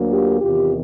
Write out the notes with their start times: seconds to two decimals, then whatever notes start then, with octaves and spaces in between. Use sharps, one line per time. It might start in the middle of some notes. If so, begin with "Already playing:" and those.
Already playing: D2 D3 F#3 A#3
0.10 F4 G4
0.41 E2 C3 D#3 F4 G4